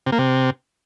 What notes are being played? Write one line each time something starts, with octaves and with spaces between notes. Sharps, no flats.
C3
A#3
C3